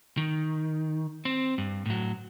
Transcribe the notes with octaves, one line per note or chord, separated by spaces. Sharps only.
D#3
C4
G2
A2 F#3